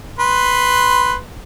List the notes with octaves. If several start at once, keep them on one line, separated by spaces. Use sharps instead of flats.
B4 C6